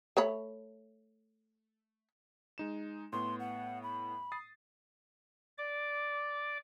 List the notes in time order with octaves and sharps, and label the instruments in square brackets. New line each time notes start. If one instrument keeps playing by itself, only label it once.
[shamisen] A3 C#5 B5
[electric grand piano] G#3 D#4 E7
[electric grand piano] A2 B3 [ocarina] C6
[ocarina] F#5
B5
[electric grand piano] D#6 A6 C7
[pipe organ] D5 D6